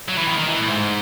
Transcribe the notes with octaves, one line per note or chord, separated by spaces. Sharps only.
F#3
E3
D#3
D#3
E3
A2
G#2